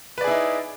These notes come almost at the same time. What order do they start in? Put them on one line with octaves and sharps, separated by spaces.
B4 D5 G#4 E4 D#4